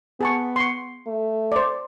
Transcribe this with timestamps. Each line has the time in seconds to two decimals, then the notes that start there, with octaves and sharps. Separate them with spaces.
0.21 B3 G#4 A5 C#6
0.56 C6 C#6
1.07 A3
1.52 C5 D5